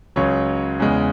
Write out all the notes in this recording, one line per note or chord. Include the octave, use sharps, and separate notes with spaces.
C#2 C#3 F#3 C#5
E2 C#3 G#3